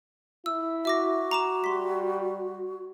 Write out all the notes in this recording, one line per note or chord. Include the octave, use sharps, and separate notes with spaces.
E4 E6
F#4 E5 D6 A#6
A#5 D6 E7
G3 C6 B6